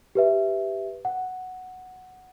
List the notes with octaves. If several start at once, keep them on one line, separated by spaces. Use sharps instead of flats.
G4 B4 E5
F#5